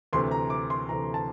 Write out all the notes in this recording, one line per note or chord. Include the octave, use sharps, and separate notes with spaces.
D2 C3 E3 C6
A#5
D6
C6
D2 C3 E3 A#5
A5